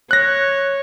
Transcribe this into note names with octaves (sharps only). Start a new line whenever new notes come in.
C#5 F#6 A#6